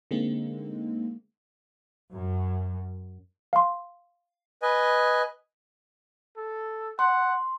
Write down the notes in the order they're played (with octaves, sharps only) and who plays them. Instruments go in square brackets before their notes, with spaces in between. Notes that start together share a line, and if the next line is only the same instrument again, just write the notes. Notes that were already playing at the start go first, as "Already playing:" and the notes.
[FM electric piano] D3 G#3 A#3 C4 D#4
[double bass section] F#2
[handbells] F5 C6
[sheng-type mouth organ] B4 D#5 G#5
[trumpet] A4
[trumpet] F#5 [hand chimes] C6